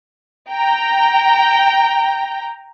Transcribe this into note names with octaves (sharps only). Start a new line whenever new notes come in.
G5 A#5